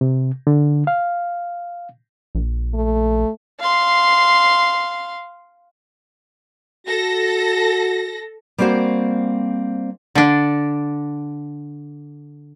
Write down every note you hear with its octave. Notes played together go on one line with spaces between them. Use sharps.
C3
D3
F5
A#1
A3
F5 C6
F#4 A4 A#6
G3 A#3 C4 F#4 C5
D3 D4